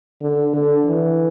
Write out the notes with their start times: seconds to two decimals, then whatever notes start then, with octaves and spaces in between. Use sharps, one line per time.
0.22 D3
0.53 D3
0.85 E3